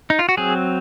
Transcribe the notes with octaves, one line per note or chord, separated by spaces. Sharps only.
D#4
F4
F#4
F#3 C4 G#4